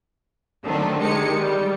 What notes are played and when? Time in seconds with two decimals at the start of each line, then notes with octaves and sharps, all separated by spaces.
0.64 D3 D#3 F#3 A3 C4 D4
0.98 D#3 G#3 G4 C#7
1.38 G3